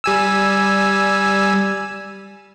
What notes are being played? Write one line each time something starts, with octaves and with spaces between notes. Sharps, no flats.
G3 G#5 E6